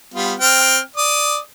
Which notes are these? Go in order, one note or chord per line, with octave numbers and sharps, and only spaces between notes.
G3 B3 F4
C4 G5 F6
D5 D#6